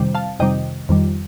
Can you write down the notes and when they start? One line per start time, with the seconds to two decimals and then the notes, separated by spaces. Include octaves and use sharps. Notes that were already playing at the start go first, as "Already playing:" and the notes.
Already playing: F2 C3 D#3 G3
0.15 F5 A5
0.39 F2 C3 D#3 G3 D#5 G5
0.89 F2 D#3 G3